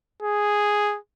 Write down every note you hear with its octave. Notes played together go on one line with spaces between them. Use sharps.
G#4